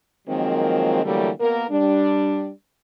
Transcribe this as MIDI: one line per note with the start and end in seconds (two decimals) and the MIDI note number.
0.28 1.01 51
0.28 1.01 53
0.28 1.01 54
0.28 1.01 56
0.28 1.01 58
0.28 1.01 60
1.05 1.30 50
1.05 1.30 52
1.05 1.30 54
1.05 1.30 55
1.05 1.30 57
1.05 1.30 58
1.40 1.65 47
1.40 1.65 58
1.40 1.65 70
1.71 2.50 55
1.71 2.50 62